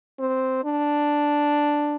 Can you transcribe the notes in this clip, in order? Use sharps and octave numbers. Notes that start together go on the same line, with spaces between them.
C4
D4